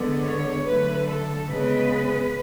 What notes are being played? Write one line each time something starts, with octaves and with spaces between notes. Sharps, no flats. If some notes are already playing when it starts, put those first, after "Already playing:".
Already playing: D3 G#3 B3
C#5
D3 F#3 A3 B4
A4
C#3 G#3 B3 B4